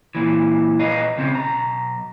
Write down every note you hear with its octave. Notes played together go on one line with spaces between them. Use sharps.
A#2 E3
A#2 B4 C#5 D#5 F5 A#5
C#3 C4 C#4
B1 A#5